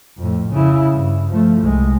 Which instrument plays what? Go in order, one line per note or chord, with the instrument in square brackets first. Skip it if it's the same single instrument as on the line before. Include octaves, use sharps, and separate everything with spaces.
[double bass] F2 A2
C#3 E4
G2
F3 A3
C2 G#3